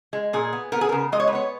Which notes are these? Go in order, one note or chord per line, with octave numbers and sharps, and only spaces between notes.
G#3
A#2 G#4
B3
B3 A#4
G#4
C#3 A#4
G#3 D#5
C#5
B4
B3 C#5